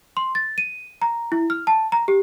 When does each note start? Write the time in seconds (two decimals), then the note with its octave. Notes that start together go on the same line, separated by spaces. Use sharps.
0.17 C6
0.35 A6
0.58 D#7
1.02 A#5
1.32 E4
1.50 F6
1.67 A5
1.92 A#5
2.08 G4